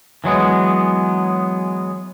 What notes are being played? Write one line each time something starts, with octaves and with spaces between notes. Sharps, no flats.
E3 F#3 G#3 B3